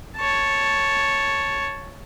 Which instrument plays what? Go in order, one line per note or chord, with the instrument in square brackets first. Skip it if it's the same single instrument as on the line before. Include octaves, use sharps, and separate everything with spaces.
[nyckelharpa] C#5 A5